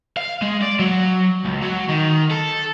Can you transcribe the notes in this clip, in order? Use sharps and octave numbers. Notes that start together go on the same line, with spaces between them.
F5
G#3
D5
F#3
C#2
F#3
D#3
A4